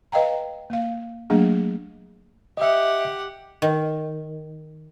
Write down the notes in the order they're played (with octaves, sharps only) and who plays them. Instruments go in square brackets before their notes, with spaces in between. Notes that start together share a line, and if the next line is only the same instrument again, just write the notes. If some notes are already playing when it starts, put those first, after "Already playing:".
[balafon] B4 D#5 F5 G5 A#5
A#3 F5
F#3 A3 A#3 D4 G#4
[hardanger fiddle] G4 F#5 [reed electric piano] D#5 E5
[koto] D#3